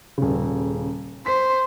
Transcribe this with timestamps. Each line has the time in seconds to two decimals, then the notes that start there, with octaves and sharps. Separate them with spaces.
0.18 D#1 C#3
1.26 C5 B6